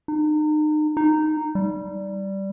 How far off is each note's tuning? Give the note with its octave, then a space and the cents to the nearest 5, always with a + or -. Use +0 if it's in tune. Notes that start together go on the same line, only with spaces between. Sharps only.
D#4 -35
D#4 -10
G3 -10